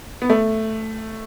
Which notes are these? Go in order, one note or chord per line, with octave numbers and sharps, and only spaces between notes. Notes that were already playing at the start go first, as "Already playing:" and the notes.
B3
A3